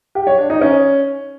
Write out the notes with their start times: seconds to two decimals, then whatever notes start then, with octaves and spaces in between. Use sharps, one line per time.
0.15 G4
0.27 C#5
0.38 D4
0.50 D#4
0.61 C#4